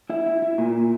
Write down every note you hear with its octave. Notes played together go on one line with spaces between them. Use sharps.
E4 E5
E4
E4
A#2